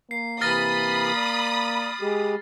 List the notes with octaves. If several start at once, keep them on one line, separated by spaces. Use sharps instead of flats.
A#3 C7
C3 E3 B5 D#6 F6 A6 A#6
D5
G#3 G4 G#4